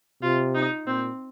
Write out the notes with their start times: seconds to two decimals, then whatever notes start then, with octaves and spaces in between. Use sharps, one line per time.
0.22 C3 F4
0.54 D#4
0.87 A#2 C4